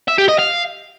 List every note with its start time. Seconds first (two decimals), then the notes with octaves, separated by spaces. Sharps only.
0.08 E5
0.18 G4
0.28 D#5
0.38 F5